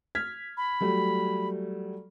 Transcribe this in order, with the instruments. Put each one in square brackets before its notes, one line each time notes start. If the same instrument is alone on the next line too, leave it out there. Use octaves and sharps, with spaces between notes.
[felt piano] F6 G#6 B6
[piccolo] B5
[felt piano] F#3 G3 A3